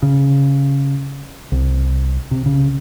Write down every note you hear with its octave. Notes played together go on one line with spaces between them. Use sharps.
C#3
C2
C3
C#3